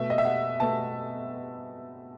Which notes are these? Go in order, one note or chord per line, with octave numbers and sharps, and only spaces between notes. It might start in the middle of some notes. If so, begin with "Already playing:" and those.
Already playing: B2 A3 E5
D#5
E5
F#5
B2 A3 A5